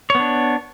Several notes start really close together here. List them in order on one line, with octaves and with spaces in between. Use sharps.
C#5 B3 D4